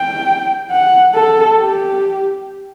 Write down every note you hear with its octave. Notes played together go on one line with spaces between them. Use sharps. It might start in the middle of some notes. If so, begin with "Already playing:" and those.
Already playing: G5
F#5
A4
G4